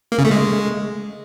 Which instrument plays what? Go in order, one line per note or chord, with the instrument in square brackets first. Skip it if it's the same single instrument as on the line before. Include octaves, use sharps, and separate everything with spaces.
[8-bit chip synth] A#3
C#3
A3
G#3